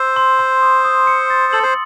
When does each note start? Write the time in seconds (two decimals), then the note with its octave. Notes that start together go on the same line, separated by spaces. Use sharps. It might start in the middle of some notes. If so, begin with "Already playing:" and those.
Already playing: C5 E6
0.16 C6
0.39 C6
0.62 D#6
0.85 D#6
1.07 C#7
1.30 A6
1.53 A4 F#7
1.63 C5